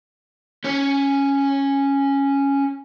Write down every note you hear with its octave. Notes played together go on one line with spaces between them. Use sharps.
C#4 C#5